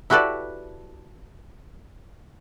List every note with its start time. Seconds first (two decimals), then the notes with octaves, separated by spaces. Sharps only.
0.10 E4 F#4 G4 A4 B4 D5